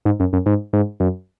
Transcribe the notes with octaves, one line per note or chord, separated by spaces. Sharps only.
G#2
F#2
F#2
G#2
G#2
F#2